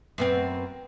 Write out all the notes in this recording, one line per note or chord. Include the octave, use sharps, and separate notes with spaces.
F#2 B3 C4